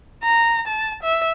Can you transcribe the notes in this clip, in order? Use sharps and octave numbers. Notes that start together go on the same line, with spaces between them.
A#5
A5
E5